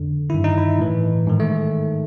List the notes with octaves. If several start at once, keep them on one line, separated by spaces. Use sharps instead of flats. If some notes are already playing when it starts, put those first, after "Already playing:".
Already playing: F2 D3
G2 D#3 E4
D#4
E4
A2 E3
G#2 D#3
A3